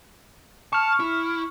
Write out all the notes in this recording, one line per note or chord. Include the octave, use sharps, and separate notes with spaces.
A5 C#6 F6
E4